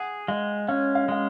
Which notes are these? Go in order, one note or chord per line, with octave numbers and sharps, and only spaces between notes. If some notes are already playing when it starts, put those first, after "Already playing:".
Already playing: G#4 F#5
G#3 F5
C#4 F5
F5
G#3 F5